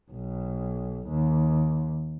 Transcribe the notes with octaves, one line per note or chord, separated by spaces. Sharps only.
B1
D#2